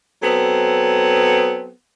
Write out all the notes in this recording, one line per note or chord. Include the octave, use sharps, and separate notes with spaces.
F#3 B3 C4 A4